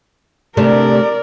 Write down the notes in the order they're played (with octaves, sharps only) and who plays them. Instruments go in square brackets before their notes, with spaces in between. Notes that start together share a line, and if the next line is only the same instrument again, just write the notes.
[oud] C3 A3 D4 [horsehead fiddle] A#4 D5